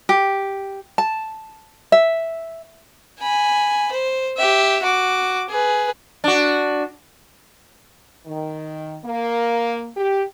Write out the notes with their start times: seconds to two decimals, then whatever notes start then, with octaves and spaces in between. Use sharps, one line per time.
0.09 G4
0.98 A5
1.92 E5
3.20 G#5 B5
3.92 C5
4.37 G4 E5
4.83 F#4 D6
5.49 G#4 B4
6.24 D4 F#4
8.26 D#3
9.05 A#3
9.96 G4